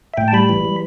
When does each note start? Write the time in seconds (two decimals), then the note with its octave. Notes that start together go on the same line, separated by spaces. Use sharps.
0.14 E5
0.17 A2 G5
0.28 A5
0.33 G3 B5
0.49 E3
0.65 G3